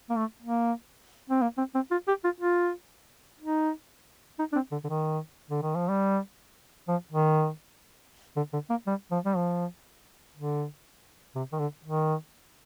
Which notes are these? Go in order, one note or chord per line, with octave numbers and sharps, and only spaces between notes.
A#3
A3
A#3
C4
A#3
C4
C4
F4
G4
F4
F4
D#4
D#4
D4
C4
D3
D3
D#3
D3
D#3
F3
G3
F3
D#3
D3
D3
A#3
G3
F3
G3
F3
D3
C3
D#3
D3
D#3